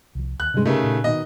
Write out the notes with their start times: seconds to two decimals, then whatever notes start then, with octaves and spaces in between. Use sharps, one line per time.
0.15 C2 F3
0.40 D#2 F#6
0.54 G2 C3 G#3 C#4
0.66 C#3 A3 D#4 G4 A#4
0.83 A#2
1.04 B2 D#3 D#5